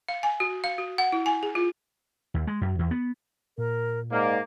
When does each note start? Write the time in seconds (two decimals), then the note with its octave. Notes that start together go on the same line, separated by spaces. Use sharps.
0.09 F5
0.23 G#5
0.40 F#4
0.64 F5
0.78 F#4
0.98 F#5
1.12 E4
1.26 G#5
1.43 G#4
1.55 F4
2.34 D#2
2.47 G#3
2.61 F#2
2.79 E2
2.91 B3
3.58 A#2 A#4
4.11 G#2 A#3 D5